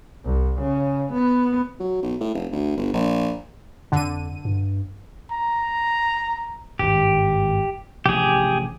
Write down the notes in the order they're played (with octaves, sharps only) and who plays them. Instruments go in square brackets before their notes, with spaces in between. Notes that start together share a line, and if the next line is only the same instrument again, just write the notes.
[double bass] C2
C#3
B3
[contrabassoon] F#3
B1
A2
F1
D2
G1
A#1
[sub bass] F2 [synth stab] D3 D#7
[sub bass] G2
[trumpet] A#5
[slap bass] G#1 G2 [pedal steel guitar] G4
[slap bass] A1 C3 F3 [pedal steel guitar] G4 G#4